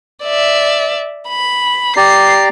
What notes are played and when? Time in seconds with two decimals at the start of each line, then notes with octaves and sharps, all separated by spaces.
0.23 D5 E5
1.29 B5
1.97 G4 D5 A#5 C7